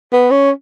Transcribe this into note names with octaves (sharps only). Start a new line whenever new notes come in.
B3
C#4